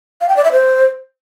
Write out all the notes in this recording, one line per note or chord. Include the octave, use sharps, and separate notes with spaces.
F5
G5
D5
E5
C5